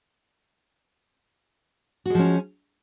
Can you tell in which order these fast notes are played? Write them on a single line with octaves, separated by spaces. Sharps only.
F#4 G#3 F3 C#4